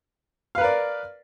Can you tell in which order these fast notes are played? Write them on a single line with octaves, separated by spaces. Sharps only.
F5 B4 A#4 D5